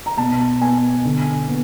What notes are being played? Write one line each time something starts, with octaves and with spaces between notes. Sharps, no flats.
A#5
B2 A5
B3 G#5
D3
B3